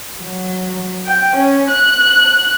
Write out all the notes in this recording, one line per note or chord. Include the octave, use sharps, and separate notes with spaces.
F#3
G5
C#4
F#6